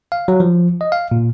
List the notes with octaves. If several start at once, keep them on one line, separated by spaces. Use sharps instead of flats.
F5
F#3
F3
D#5
F5
A#2